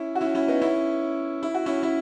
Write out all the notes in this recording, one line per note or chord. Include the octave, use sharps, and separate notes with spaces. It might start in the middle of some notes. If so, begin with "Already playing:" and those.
Already playing: C#4 E4
F#4
C#4 E4
C#4 E4
B3 D#4
C#4 E4
E4
F#4
C#4 E4
C#4 E4